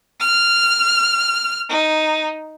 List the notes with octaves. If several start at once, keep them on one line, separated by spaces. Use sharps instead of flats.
F6
D#4